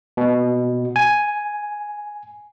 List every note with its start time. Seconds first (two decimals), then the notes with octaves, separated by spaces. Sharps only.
0.17 B2
0.96 G#5